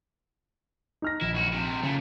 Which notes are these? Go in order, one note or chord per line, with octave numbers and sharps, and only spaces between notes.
D#4 F6 A#6
A#1 E4
C#2 F#4
C3 G#3
A#2 C#3 A3